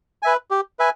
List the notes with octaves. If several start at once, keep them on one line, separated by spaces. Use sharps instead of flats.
B4 E5 G#5
G4
B4 E5 G#5